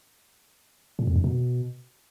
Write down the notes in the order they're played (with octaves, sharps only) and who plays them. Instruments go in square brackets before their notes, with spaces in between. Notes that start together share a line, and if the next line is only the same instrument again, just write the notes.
[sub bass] A#2
F2
F#2
B2